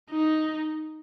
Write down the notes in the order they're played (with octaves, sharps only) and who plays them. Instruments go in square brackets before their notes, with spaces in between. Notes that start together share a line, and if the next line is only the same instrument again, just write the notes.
[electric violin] D#4